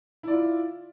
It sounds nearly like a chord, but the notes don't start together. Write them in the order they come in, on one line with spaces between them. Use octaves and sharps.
E4 D5 F4